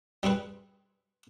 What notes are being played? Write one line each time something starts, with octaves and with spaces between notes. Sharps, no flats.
G3 C4 G#4 B4